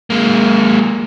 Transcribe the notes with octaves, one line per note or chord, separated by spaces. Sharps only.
G#3 A#3